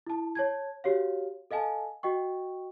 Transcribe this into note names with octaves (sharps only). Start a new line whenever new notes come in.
E4 A5
C#5 A5 G#6
F#4 G4 C#5 F5
A4 D#5 F5 G#5 A5
F#4 D#5 G5 C#6